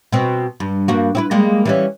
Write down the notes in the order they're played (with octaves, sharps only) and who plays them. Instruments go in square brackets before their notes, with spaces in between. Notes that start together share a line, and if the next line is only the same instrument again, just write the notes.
[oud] B2 C4
G2
G2 A#3 F#4
C4 E4 B4
G3 G#3 A#3
E3 G3 C#4